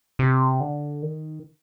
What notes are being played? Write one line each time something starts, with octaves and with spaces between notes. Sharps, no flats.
C3
D3
D#3